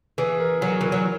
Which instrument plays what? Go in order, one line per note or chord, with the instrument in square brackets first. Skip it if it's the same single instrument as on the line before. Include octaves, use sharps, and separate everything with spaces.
[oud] E3 [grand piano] G#4
[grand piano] A#4
[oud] F#3 [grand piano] G#4
[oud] E3 [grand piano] A#4
[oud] F#3